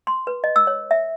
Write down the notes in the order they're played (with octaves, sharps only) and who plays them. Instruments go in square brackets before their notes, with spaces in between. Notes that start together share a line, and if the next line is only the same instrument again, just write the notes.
[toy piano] C6
B4
D#5
E6
C#5
E5